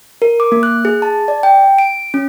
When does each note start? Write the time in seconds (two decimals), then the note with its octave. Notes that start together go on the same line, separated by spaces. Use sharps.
0.22 A#4
0.40 D6
0.52 A#3
0.63 F#6
0.85 G#4
1.02 A5
1.28 D5
1.43 G5
1.79 D7
2.14 C#4